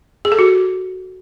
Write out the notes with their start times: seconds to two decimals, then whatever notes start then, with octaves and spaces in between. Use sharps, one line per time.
0.25 G#4
0.32 A4
0.39 F#4